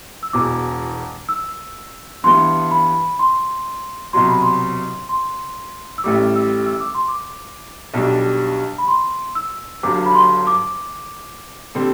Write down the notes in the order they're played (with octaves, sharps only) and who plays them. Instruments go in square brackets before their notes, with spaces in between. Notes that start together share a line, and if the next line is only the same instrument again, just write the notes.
[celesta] E6
[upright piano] E1 E2 B2 [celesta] D6
[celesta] E6
[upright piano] G2 E3 B3 [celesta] C6
[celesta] B5
C6
[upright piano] C2 B2 F#3 [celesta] C6
[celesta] B5
C6
C6
E6
[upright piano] A1 A2 G3 [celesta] D6
[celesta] E6
E6
D6
C6
D6
[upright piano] B1 B2 G3 D4
[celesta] B5
C6
E6
[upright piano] G1 G2 F#3 [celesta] D6
[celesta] B5
C6
D6
[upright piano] D3 G3 C4